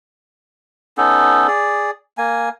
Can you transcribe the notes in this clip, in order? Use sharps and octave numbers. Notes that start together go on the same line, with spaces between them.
B3 C#4 D#4 A4
G#4 D5
A#3 G#5